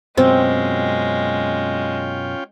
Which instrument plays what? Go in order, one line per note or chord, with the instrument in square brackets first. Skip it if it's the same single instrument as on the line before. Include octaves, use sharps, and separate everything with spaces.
[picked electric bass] F#2 B2 [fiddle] G#3 [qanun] C4 [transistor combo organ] C#4 F4 G5